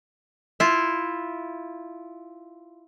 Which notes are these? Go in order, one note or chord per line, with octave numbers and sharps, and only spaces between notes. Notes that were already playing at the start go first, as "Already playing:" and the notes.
E4 F4